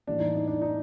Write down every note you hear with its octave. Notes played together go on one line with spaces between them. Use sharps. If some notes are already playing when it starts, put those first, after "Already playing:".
A2 E3 G3 A#3 C#4 D4
D#4
D#4
D4
D#4